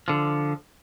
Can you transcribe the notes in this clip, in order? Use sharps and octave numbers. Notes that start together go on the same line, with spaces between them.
D3 F3